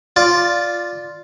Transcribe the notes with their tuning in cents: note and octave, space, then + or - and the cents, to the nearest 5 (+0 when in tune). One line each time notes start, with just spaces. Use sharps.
F4 +0 D5 +0